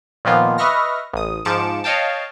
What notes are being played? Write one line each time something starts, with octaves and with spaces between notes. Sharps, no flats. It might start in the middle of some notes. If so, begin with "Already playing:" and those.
A#2 D#3 F3 A#3 B3 F4
B4 D#5 E5 C#6 F6 A#6
A1 D#6
G#2 F3 D6 C#7 E7
C#5 D#5 F5 G5 A5